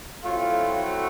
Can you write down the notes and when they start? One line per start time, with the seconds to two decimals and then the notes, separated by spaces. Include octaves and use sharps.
0.23 A2 F#3 A3 C4 E4 F4
0.70 F#4